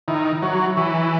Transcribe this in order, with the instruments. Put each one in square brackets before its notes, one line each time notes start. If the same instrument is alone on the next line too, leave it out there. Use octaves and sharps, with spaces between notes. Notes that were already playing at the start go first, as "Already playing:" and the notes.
[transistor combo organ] D#3 [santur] E4
[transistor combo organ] F#3 [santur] C#5
[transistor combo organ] E3 [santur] C#5